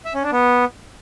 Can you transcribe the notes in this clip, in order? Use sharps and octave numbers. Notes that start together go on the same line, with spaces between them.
E5
C#4
D4
B3